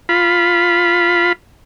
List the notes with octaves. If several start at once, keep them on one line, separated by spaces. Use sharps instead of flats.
F4 B5